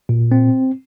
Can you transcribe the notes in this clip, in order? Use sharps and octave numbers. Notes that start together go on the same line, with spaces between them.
A#2
C4